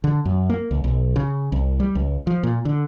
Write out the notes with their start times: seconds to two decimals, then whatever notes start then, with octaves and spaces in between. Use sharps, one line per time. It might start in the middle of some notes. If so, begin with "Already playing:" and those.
0.04 D3
0.25 F#2
0.50 A#3
0.71 C#2
0.84 B1
1.16 C#3
1.52 C2
1.80 G3
1.95 C#2
2.27 F3
2.43 A#2
2.65 D3